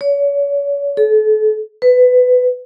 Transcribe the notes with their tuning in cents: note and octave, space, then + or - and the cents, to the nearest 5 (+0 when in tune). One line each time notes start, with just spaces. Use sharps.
C#5 +35
A4 -35
B4 +20